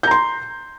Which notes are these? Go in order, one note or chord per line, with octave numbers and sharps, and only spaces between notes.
A#5 C6 G6